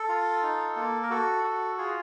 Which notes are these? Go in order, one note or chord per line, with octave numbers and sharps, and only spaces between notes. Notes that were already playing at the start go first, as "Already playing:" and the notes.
Already playing: A4
F4
D#4
A#3
A#4
F#4 A4
F#4
F4 G#4